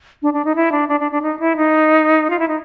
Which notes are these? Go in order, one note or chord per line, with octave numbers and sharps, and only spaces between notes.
D4
D4
D#4
E4
D4
D4
D4
D4
D#4
E4
D#4
F4
E4
D#4